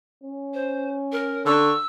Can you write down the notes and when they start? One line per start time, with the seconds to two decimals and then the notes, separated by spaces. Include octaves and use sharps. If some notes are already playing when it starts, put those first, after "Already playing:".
0.23 C#4
0.54 C5
1.12 A#4
1.46 D3 C#6 E6